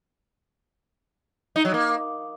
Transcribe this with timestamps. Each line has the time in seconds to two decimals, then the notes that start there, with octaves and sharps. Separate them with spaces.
1.56 D#4
1.65 F#3
1.74 A#3